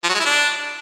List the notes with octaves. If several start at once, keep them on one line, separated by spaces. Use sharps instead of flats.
F3
F#3
G#3
E4
D4